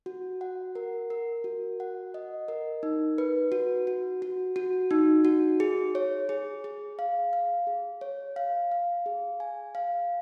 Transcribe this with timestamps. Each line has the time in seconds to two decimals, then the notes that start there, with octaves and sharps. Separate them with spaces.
0.06 F#4
0.41 F#5
0.75 A#4
1.10 A#4
1.44 F#4
1.80 F#5
2.14 D#5
2.48 A#4
2.83 D#4
3.18 B4
3.52 F#4
3.87 F#4
4.22 F#4
4.56 F#4
4.91 D#4
5.25 F#4
5.60 G#4
5.95 C#5
6.29 G#4
6.64 G#4
6.99 F5
7.33 F5
7.67 G#4
8.01 C#5
8.36 F5
8.72 F5
9.06 G#4
9.40 G#5
9.75 F5